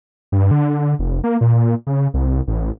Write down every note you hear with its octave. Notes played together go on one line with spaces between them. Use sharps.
G2
D3
F1
A#3
A#2
A#2
C#3
C2
A1